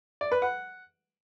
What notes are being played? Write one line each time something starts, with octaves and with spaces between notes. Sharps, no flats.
D5
B4
F#5